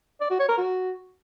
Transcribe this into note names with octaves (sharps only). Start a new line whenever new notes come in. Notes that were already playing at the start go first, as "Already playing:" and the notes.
D5
F#4
C#5
A#4
F#4